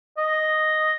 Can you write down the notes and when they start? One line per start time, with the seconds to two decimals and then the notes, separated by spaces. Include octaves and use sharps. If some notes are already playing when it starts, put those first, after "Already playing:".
0.17 D#5